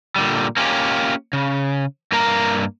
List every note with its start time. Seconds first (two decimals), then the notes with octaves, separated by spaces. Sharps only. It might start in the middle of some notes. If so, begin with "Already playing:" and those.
0.16 A#2 D3 G3
0.57 A#3 C#4 F4 G4
1.33 C#3
2.12 G2 A#3 A#4 F5 A#5